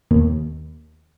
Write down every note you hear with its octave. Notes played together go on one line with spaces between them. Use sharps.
D#2